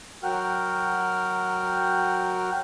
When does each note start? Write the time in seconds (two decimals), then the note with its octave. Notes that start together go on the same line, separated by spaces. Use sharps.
0.23 F#3 F#4 A#4 F#5 G5 F6